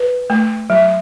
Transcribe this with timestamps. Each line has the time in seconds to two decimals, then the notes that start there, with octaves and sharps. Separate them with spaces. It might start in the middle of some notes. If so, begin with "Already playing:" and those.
Already playing: B4
0.30 A3
0.70 F#3